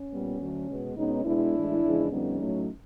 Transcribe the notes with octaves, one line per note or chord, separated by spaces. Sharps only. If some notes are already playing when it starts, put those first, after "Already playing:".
Already playing: C#4
A#2 G3 B3
D2 D3 F#3 A3
B2 G#3 B3
B2 G#3 B3 C#4 D#4
B2 G#3 B3 D4 E4
A2 E3 G#3
E2 C#3 F3 G#3
F2 D3 G3 B3 C#4 D#4
A2 F#3 A3